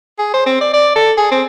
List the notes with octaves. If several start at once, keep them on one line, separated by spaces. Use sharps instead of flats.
G#4
C5
C4
D5
D5
A4
G#4
C4